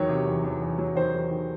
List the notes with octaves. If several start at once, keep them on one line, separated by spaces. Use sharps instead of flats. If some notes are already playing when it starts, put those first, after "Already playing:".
Already playing: E2 D#3 F#3 C#5
C3
E2
E2
E2
F#3
D#3 C5
E2
D#3